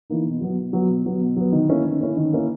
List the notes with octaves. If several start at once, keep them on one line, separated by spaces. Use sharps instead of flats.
E3 A#3 D#4
B2
F#3 B3
B2
F#3 B3
B2
F#3 B3
B2
F#3 B3
D#3
A#3 C#4 E4
D#3
A#3 C#4 E4
D#3
A#3 C#4 E4